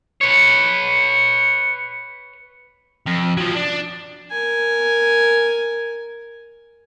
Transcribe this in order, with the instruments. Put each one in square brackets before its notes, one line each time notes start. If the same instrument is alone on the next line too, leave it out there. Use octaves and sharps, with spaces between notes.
[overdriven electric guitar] B4 C#5
F2
F3 F#3
D4
[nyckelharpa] A#4 G#5